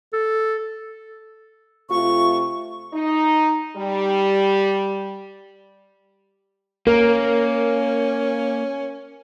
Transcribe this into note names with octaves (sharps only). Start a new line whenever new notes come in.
A4
C3 A3 F4 C#6
D#4
G3
A#3 C#4 A#4